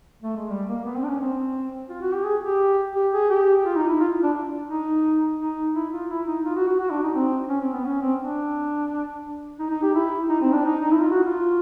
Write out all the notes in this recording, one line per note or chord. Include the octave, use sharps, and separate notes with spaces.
A3
G#3
G3
A#3
B3
C4
D4
C#4
C4
F4
F#4
G4
G#4
G4
G4
G#4
G4
F4
D#4
E4
F4
D4
D#4
D#4
E4
F4
E4
D#4
F4
F#4
F#4
F#4
D4
D#4
C4
C#4
C4
B3
C#4
C4
D4
D#4
D#4
G4
E4
D#4
C4
D4
D#4
D#4
E4
F4
F#4
F4